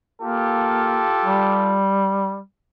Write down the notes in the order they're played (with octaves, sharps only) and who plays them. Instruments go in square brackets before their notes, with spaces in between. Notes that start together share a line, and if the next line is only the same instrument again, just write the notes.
[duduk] A#3 [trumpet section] F4 G4 A4
[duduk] G3